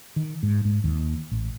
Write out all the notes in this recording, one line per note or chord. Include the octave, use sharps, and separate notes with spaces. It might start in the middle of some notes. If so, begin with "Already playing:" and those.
D#3
G#2
G#2
D#2
A1